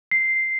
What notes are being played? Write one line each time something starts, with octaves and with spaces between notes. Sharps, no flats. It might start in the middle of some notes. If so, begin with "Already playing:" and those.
C7